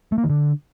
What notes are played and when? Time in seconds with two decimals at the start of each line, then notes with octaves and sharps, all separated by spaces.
0.12 A3
0.18 A#3
0.24 D#3
0.30 D3